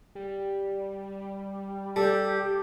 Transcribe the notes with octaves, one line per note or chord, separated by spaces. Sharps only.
G3
G3 G4 A4